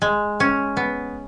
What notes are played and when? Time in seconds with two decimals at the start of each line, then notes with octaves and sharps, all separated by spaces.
0.02 G#3
0.40 C#4
0.77 B3